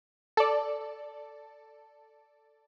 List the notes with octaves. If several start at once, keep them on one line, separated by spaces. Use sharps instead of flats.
A4 D5